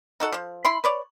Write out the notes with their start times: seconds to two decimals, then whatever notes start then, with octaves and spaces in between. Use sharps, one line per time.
0.20 D#4 F#4 A4 F#5
0.32 F3 C5
0.65 E4 B5 C6
0.84 B4 C#5 D5